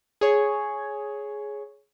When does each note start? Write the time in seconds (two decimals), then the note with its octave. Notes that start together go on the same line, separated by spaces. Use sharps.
0.21 G#4 C#5